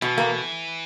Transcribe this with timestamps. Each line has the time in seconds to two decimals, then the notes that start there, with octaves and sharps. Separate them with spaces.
0.02 B2 E3
0.18 A#3